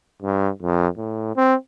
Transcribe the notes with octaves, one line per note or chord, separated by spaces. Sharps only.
G2
F2
A2
C4